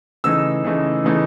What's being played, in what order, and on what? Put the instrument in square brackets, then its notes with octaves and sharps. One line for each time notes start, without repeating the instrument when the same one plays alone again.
[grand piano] C#3 E3 A3 D#4 E6
C#3 E3 A3 D#4
C#3 E3 A3 D#4